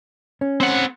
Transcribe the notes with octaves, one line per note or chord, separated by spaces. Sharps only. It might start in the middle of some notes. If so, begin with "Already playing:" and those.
C#4
C4 F#5